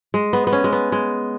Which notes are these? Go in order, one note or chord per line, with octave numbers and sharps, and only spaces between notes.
G#3
B3
B3
C#4
G#3
B3
G#3